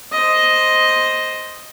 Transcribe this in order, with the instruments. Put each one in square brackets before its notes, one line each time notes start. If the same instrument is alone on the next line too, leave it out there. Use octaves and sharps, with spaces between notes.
[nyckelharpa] C5 D#5